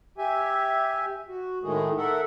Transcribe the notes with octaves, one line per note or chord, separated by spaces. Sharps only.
G4 E5 G#5
F#4
A2 D#3 G#3 A3 G#4
A4 A#4 E5 F#5